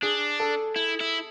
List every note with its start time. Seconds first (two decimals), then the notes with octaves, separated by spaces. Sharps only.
0.03 D4 G#4
0.40 A4
0.76 E4
1.00 E4